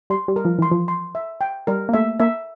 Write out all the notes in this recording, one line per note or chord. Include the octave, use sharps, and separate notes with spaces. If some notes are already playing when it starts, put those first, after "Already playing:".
G3 C6
G3
A#4
F3
E3 C6
F3
C6
E5
G5
G3 A#4
A#3
A3 E5
A#3 E5